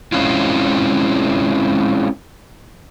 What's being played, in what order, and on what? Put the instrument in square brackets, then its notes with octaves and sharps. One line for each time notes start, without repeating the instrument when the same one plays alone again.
[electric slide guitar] G#3 C4 C#4 E4 F4